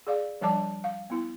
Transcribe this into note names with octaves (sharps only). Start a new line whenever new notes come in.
G#4 D5 F5
F3 G3 D4 D5 A5 D6
F5
B3 E4